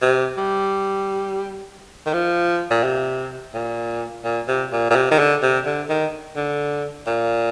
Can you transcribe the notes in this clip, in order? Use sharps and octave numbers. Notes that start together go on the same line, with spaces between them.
C3
G3
D#3
F3
A#2
C3
A#2
A#2
C3
A#2
A#2
C3
D#3
D3
C3
D3
D#3
D3
A#2